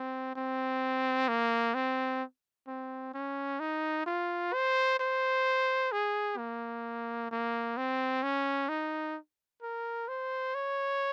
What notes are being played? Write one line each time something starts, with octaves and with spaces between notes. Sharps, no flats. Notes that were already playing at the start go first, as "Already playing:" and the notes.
Already playing: C4
C4
A#3
C4
C4
C#4
D#4
F4
C5
C5
G#4
A#3
A#3
C4
C#4
D#4
A#4
C5
C#5